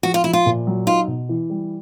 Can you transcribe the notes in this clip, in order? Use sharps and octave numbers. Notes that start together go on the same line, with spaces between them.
F3 F#4
F4
F3 E4
F4
A#2
F#3
D#4 F4
B2
E3
G3